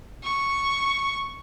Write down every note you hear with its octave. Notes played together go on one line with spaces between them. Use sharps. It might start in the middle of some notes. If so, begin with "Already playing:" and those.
C#6